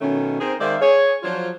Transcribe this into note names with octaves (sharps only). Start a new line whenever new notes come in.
B2 D#3 A3 C#4
C4 D#4 G#4 A#4 C5
D#3 G#3 C5 D5 E5 F5
G#4 C#5
F3 F#3 D4 F4 C5